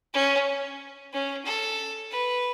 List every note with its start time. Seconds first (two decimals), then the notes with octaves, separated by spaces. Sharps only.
0.14 C#4
1.13 C#4
1.46 A4
2.11 B4